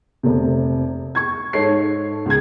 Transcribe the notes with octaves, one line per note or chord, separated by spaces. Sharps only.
F1 C3
C#6 G#6
G#2 A4 C#5 C7
C#2 G#6